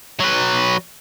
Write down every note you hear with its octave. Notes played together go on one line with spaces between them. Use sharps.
F#3 B4